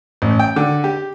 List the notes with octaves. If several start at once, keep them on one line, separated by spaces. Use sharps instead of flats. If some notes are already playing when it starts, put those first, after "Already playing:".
A1
G5
D3
G4